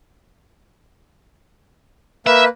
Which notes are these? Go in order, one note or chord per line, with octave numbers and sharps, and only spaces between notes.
A#3 B4 E5